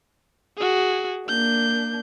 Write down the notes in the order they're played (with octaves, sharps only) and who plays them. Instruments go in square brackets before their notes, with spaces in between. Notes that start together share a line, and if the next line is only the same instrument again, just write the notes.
[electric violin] F#4 G#4
[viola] A#3 D4 [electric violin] G6